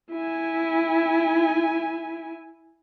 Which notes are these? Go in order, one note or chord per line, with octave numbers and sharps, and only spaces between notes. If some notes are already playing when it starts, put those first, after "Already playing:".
E4 G#5